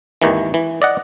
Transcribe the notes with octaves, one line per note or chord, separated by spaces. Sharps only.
G#1 D#2 D#3 E3
E3
D5 D#5 F#5